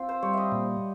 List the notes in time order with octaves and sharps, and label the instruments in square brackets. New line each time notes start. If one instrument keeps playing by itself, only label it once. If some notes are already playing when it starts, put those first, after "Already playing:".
Already playing: [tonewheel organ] C4 [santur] F4
[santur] C5
[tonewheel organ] G3 [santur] C#5
[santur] D#5 E5
[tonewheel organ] A#2